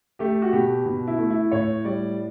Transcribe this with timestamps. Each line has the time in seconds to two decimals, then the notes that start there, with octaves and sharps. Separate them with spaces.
0.19 A3 G4
0.42 F#4
0.52 B2 G4
0.86 B2
1.07 E4
1.18 A3
1.30 E4
1.52 A2 C#5
1.84 G3 D5